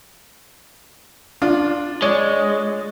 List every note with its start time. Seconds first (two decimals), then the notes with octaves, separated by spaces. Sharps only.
1.42 D4 F4
2.02 G#3 C#5 D5